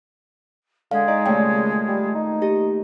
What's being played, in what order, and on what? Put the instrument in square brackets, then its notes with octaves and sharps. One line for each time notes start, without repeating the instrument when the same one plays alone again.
[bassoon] D3 [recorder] G#3 [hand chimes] F5
[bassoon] D#4 [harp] D5
[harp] D#2 A#2 A3 [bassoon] C#3 [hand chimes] G5
[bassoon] G3
D#4
[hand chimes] G4 [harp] D#5